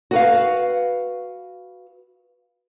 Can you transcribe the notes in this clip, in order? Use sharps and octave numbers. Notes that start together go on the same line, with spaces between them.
F#4 B4 F5